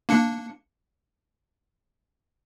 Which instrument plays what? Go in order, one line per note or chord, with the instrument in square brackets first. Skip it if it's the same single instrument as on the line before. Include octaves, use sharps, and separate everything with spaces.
[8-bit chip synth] A#3 D4 C#7